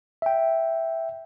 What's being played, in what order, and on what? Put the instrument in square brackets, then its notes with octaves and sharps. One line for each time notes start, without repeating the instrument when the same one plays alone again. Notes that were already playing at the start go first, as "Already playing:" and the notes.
[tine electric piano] E5 G5